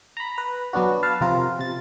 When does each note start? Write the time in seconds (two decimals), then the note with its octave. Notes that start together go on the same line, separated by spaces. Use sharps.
0.17 A#5 B5
0.38 B4
0.73 F#3 B3 D4 F#4
1.03 B4 F5 A5
1.21 C3 F3 C4 F4 A#4
1.59 C3 A6